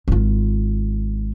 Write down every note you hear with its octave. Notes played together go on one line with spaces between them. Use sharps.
G#1 F4